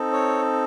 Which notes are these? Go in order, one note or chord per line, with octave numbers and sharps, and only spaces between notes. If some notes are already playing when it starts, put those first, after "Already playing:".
Already playing: C4 D#4 A4
C#5